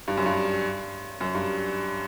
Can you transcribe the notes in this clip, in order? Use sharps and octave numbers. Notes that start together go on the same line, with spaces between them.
G2
F#2
G2
F#2
G2